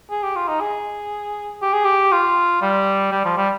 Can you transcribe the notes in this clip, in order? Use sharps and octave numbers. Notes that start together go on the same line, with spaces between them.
G#4
G4
F4
D#4
G#4
G4
G#4
G4
F4
G3
G3
F3
G3